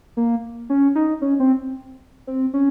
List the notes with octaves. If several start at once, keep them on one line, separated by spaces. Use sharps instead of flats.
A#3
C#4
D#4
C#4
C4
C4
C#4